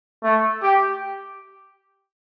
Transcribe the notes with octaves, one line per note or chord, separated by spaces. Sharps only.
A3
G4